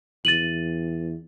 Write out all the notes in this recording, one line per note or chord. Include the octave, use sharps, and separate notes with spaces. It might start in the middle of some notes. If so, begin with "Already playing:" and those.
E2 A6 D#7 F#7